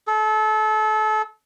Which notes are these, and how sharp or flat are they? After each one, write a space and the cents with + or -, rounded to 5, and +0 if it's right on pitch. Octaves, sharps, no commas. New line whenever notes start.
A4 -30